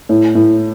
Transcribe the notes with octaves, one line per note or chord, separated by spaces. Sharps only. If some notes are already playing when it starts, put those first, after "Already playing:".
A2
A2